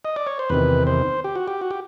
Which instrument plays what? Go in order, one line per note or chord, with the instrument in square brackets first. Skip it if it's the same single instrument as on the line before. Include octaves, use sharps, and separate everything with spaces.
[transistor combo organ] D#5
D5
C#5
C5
E2 C3 D#3 B4
C5
G4
F#4
G4
F#4
G4